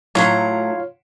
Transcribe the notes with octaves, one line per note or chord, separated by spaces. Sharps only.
A2 F#3 E4 F4 C#5 F5 A#5